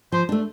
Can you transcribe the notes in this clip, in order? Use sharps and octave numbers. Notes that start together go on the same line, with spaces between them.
F3 C5
A3 D4